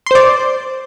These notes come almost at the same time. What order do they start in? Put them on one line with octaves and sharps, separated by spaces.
C6 C5 D5